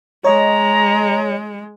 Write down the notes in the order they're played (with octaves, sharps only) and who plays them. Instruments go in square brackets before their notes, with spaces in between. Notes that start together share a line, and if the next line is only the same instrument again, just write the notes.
[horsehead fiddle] G#3 [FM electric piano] C#5 D#5 [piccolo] A#5